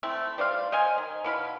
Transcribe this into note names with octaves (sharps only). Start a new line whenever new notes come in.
A3 C4 E4
G3 C5 D5 F5
C5 D#5 F5 G#5
D#3
B2 E4 F5 B5